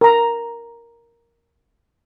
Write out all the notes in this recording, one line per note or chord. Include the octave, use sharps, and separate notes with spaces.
A#4 A#5